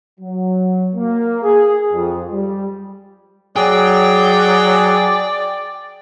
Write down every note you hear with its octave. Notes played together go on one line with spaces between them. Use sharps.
F#3
A#3
G#4
F2
G3
F#3 G#4 D5 G5